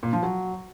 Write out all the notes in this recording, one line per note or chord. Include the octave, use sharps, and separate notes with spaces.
A#2
F3
F#3